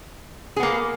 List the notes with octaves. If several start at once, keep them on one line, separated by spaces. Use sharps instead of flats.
A#3 B3 G#4